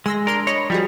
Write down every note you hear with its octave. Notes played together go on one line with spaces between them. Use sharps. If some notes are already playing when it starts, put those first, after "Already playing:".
G#3 C6 E6 A#6
D4 A#4 C6 D7
C#5 D#5 B5 A#6
F3 G3 F#4 G#4